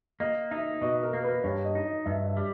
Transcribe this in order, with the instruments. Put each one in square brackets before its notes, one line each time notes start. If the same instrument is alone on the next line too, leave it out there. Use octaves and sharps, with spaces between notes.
[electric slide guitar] A#3 [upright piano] D#5
[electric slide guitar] D#4 [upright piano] E5
[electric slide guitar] B2 [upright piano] D#5
[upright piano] A#4
[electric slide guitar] A#3
[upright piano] B4
[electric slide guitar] G2 [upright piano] C#5
[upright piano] D#5
[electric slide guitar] D#4
[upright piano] D#5
[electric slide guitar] G2 [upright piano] E5
[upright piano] E5
[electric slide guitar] G3